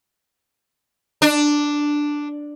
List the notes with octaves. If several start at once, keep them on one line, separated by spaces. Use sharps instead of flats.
D4